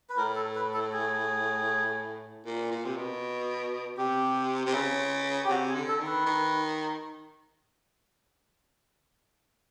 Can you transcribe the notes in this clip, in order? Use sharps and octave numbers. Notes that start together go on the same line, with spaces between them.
B4
A2 A#4
A4
B4
A4
G#4
A#2
A#2
C3
B2
C3 G4
C3
C#3
G4
C3 F#4
G#4
D3
A4
D#3
B4
D#3